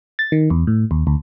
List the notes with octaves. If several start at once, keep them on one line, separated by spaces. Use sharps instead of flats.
A6
D#3
E2
A2
D#2
D2